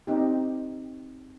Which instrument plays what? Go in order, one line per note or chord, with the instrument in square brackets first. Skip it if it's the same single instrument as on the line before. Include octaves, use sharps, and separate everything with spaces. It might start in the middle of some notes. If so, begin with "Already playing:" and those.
[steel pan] C4 D#4 G4